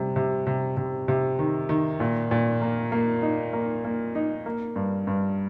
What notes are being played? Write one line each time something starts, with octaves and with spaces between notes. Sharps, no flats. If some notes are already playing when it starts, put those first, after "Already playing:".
Already playing: C3 G3
C3
C3
C3
C3
D#3
D#3
A#2
A#2
A#3
A#3
D#4
A#3
A#3
D#4
A#3
G2
G2